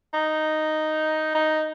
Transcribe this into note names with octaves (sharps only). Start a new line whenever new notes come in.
D#4
D#4